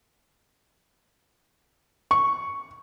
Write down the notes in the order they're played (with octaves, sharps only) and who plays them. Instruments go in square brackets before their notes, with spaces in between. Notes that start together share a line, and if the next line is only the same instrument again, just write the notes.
[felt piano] C#6